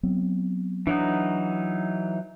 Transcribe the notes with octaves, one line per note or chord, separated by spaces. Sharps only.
F#3 B3 C4
E3 F#3 D4 D#4